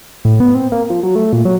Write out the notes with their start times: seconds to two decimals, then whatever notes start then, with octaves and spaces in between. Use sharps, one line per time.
0.25 A2
0.40 B3
0.54 C4
0.72 A#3
0.90 F3
1.03 F#3
1.15 A3
1.33 A#2
1.45 F#3